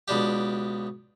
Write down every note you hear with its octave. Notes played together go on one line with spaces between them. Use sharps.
C#2 B2 D4 G4